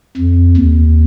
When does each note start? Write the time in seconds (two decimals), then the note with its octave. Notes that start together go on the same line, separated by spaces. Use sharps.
0.17 F2
0.57 D#2